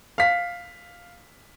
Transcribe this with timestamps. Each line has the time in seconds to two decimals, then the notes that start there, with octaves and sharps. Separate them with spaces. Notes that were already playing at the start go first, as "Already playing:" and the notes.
0.18 F5 B6